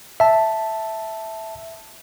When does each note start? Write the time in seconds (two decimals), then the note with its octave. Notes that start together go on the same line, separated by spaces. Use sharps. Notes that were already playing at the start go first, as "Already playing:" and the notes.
0.20 E5 A5